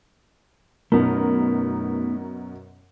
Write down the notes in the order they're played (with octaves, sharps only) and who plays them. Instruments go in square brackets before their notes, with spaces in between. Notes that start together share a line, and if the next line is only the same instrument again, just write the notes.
[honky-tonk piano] F#2 B2 A#4 [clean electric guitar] A3 B3 D#4